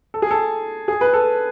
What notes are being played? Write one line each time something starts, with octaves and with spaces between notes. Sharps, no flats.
A4
G#4
A4
G#4
B4
A4